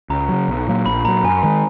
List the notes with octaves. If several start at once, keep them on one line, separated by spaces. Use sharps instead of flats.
C#2 A#5
C#3 F#3
B1
A#2 F#3 A#3
A#1 B5
A#2 F#3 A#5
F#2 G#5
D#3 G#3